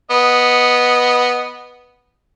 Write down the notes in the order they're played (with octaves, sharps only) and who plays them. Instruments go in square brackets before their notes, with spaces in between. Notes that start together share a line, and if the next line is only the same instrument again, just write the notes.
[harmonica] B3 D#5